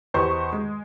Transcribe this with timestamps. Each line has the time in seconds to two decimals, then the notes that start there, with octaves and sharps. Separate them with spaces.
0.14 E2 G4 B4 C5 D#5 C#6
0.53 G#3